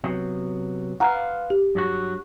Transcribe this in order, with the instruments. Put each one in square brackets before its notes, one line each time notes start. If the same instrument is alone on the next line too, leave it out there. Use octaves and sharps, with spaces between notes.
[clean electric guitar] C3 F#3 B3
[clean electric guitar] F4 B4 F5 [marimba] F#5 A#5
[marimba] G4
[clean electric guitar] G2 F#3 F#4